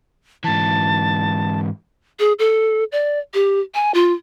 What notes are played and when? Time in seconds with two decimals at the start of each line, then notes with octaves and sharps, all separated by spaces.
0.44 G#2 E3 A5
2.19 G#4
2.39 A4
2.92 D5
3.34 G4
3.74 G#5
3.94 F4